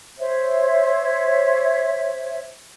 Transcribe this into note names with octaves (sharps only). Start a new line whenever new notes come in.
C5 C#5 E5